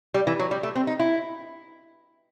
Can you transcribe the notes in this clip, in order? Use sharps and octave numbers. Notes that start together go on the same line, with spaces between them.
G3
E3
F#3
G3
A3
C4
D#4
E4